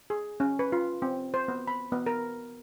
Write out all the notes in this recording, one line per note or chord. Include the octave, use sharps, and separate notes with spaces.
G#4
C#4
B4
F4
C4
C5
B3
B5
B3
A#4